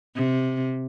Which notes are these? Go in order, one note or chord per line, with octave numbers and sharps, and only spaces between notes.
C3